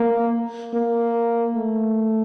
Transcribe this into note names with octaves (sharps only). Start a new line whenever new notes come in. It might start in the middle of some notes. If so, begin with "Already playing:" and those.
Already playing: A#3
A#3
A3